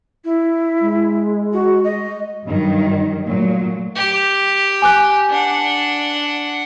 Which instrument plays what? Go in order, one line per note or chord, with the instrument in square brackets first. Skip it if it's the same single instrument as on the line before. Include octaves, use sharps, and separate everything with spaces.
[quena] E4
[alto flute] G#3
[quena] F#4
D#5
[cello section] G2 D#3 F#3
A#2 F#3 A3
[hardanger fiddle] G4
[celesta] G#5 D6 F#6
[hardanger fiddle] D4 F#5